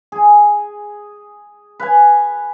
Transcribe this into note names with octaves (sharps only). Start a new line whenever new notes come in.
G#4
B4 F5 G#5